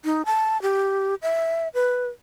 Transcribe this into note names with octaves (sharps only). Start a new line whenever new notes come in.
D#4
A5
G4
E5
B4